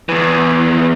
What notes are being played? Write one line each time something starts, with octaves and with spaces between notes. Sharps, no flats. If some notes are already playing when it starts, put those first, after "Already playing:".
E2 E3